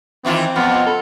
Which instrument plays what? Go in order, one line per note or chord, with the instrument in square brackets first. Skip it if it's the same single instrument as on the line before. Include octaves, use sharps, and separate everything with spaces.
[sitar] D#3 E3 F4 [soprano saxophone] C4
[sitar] F2 [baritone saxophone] B3 [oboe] F4
[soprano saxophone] A4